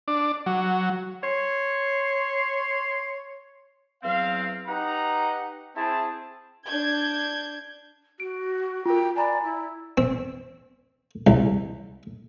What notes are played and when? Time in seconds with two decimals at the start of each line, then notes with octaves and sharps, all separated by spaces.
0.08 D4
0.46 F#3
1.24 C#5 C6
4.03 E2 F#3 C4 F5
4.67 D#4 G4 B4 F#5 A#5
5.76 C4 E4 G#4 A5
6.66 D4 G6 G#6
8.20 F#4 D7
8.86 F4 A#4 G5
9.16 D5 G#5 A#5 B5
9.43 E4
9.98 C4
11.27 C2